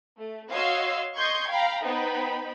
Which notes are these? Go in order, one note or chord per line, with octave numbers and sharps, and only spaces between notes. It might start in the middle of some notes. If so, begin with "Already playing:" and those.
A3
F#4 C#5 D#5 F5 C6 E6
D#5 C6 C#6 G6 G#6
F5 G5 A#5 B5
B3 D#4 C5 G5 B5